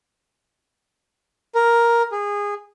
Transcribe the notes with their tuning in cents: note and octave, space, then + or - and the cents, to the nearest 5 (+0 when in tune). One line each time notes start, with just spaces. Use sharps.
A#4 +5
G#4 -20